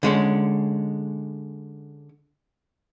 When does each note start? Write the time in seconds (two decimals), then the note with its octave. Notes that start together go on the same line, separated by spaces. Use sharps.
0.03 D3 G#3 C#4